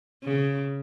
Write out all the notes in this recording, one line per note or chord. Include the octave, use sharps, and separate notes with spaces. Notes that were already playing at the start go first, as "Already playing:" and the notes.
C#3